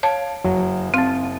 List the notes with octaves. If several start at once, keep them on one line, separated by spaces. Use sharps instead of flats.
C#5 F5 A5 G#6 D7
F#1 F#3
C4 F5 A5